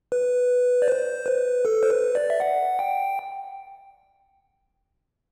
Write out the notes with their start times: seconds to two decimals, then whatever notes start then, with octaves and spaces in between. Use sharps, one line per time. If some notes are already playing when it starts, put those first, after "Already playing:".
0.12 B4
0.82 D5
0.88 C5
1.26 B4
1.65 A4
1.83 C5
1.91 B4
2.15 D5
2.30 E5
2.40 F#5
2.79 G5